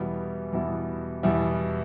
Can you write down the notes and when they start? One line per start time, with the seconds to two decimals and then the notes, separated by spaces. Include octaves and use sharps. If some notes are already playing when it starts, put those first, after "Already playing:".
Already playing: E2 B2 G3 B3 E4
0.52 E2 B2 G3 B3 E4
1.23 E2 B2 G3 B3 E4